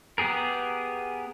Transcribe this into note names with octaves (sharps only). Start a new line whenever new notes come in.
B3 G4 G#4 A#4